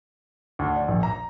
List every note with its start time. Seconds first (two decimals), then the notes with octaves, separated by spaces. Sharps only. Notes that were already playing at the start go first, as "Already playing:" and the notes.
0.59 D2
0.76 D5
0.88 A#1
1.03 A#5